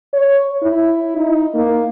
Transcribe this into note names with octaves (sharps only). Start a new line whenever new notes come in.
C#5
E4
D#4
A#3